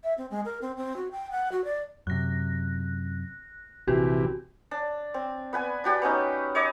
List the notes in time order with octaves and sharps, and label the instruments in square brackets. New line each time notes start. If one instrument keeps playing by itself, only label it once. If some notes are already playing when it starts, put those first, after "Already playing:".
[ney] E5
C4
G#3
A#4
C4
C4
F#4
G5
F#5
F#4
D5
[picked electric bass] F#2 C3 [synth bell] F#6 A#6
[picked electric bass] A#1 [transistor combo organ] C3 E3 [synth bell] F#4 G4
[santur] D4
C4
B3 B4 G#5
D4 F#4 G4 D5
B3 C#4 D#4
C#5 D#5 D6